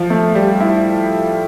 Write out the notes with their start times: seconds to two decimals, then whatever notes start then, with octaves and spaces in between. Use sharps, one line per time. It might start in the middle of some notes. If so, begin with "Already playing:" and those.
Already playing: F3
0.10 A3
0.35 G3
0.60 E4